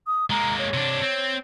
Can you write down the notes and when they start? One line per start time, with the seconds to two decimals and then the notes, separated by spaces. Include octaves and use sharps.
0.07 D#6
0.30 G#3 A#3 A#5
0.58 C#5
0.74 C3 D4
1.02 C4